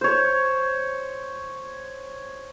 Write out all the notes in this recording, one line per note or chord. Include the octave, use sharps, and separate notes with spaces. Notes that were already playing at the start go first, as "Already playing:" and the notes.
C5 C#5